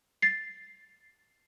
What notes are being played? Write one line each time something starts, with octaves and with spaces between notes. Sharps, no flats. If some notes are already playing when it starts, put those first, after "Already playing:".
A6 C7